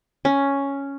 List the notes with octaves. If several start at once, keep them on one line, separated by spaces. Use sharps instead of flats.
C#4